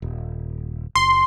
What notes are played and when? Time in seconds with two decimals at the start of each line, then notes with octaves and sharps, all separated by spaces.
0.02 D#1
0.95 F#1 C6